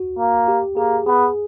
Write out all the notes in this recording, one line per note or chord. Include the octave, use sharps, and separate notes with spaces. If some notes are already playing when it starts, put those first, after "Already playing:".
Already playing: F#4
A#3
G4
A#3 G#4
B3 G#4